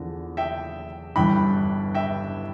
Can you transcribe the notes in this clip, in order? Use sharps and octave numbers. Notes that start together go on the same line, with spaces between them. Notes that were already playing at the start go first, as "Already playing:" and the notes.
Already playing: E2 D3 F3
E5 G5
G1 G2 E3 G5 B5
E5 G5